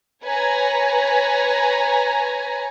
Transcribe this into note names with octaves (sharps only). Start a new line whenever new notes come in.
B4 C#5 G#5 A#5